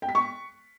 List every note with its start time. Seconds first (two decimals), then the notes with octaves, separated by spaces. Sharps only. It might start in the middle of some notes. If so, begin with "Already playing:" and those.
0.02 G5
0.09 B6
0.15 C#6